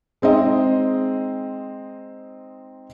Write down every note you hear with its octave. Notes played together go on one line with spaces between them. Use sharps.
G#3 C4 D#4 D#5